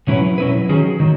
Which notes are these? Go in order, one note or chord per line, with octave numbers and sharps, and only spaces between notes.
B2 F#3 C#4 E4 B4
B2 F#3 C#4 E4 B4
D#3 F#3 C#4 G#4
D#3 F#3